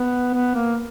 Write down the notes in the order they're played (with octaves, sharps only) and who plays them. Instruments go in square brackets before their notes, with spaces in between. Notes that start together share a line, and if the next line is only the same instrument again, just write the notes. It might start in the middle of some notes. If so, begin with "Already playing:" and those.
Already playing: [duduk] B3
B3
A#3